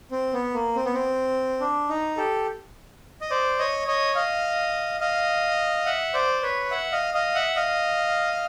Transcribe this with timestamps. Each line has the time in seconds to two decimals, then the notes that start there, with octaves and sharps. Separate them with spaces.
0.11 C4
0.33 B3
0.54 A#3
0.75 C4
0.85 B3
0.94 C4
1.60 D4
1.89 D#4
2.17 G4 A4
3.21 D#5
3.30 C5 D5
3.59 C#5 D#5
3.88 C#5 D#5
4.15 D#5 F5
5.00 D#5 F5
5.86 E5 F#5
6.14 C5 D5
6.43 B4 C#5
6.71 E5 F#5
6.92 D#5 F5
7.14 D#5 F5
7.35 E5 F#5
7.56 D#5 F5